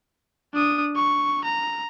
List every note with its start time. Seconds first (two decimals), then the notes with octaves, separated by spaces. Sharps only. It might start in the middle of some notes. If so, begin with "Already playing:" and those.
0.54 D4 D#6
0.96 C#6
1.45 A#5